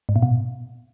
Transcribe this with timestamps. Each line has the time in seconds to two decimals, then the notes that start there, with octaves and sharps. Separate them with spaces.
0.09 G#2
0.16 A#2
0.22 B2